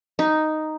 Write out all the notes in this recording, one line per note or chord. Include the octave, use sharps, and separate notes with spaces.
D#4